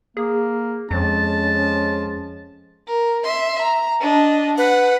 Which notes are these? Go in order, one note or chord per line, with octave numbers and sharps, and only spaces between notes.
A#3 G#4
F2 F3 G#3 C#4 A5
A#4
E5 C6
A#5
D4 D#5
B4 F#5